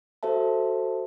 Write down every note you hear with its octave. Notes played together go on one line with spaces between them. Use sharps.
F#4 A4 C5 E5 A5